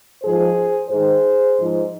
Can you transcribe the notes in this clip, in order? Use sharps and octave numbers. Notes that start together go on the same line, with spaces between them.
G#2 F3 G#4 C5
G#2 D#3 G#4 C5
G#2 F3